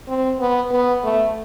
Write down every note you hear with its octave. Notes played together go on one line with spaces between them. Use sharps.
C4
B3
B3
A3